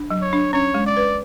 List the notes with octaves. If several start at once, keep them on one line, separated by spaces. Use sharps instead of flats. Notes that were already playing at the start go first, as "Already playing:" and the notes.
Already playing: D4
F#3
C#5
D4
C#4 C#5
G#3
D5
B4